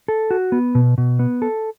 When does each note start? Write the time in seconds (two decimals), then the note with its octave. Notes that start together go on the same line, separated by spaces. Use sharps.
0.08 A4
0.31 F#4
0.52 B3
0.75 B2
0.98 B2
1.19 B3
1.42 A4